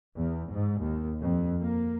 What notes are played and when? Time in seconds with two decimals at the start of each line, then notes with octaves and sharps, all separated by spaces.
0.16 E2
0.51 G#2
0.82 D#2
1.20 F2
1.64 A#3